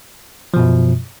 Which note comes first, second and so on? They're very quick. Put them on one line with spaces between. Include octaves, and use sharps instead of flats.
F3 B2 F#2